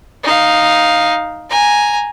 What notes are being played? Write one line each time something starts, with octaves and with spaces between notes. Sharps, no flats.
D#4 F5
G#5 A#5